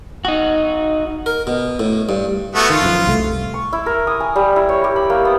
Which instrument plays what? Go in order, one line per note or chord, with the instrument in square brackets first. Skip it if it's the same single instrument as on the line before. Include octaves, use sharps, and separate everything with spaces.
[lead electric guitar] D#4 F#4
[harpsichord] A#4
B2
A2
G2
[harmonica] A3 B3 F#4
[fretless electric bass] D#3 [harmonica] F4
[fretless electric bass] F#2 F3
C2 A3
[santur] C#6
E4
A#4
D#6
G#5
G3
E4
C#5
G4
B5
A#3
B3